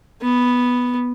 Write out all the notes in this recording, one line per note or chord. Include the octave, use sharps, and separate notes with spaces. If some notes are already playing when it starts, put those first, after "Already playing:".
B3